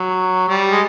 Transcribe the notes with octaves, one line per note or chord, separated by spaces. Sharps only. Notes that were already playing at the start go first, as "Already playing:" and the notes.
Already playing: F#3
G3
G#3